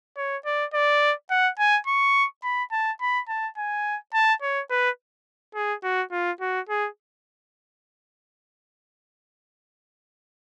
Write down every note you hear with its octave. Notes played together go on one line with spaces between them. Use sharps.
C#5
D5
D5
F#5
G#5
C#6
B5
A5
B5
A5
G#5
A5
C#5
B4
G#4
F#4
F4
F#4
G#4